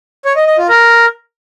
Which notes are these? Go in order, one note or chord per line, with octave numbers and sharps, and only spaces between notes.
C#5
D#5
D#5
F4
A#4